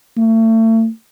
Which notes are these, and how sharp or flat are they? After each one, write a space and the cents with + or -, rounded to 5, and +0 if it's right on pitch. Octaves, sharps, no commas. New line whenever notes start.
A3 +35